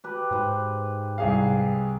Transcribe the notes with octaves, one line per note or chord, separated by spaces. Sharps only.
G4 B4
G#2 B4 C5 G5
C2 G#4 F5